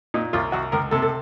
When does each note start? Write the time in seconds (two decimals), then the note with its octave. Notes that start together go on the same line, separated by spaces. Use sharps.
0.14 A#2 D#4
0.33 C2 F4
0.52 C2 F#4
0.72 C#2 A#4
0.91 C3 A4
1.02 A4